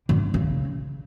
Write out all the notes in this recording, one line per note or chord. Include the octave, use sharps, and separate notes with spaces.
D3
C#3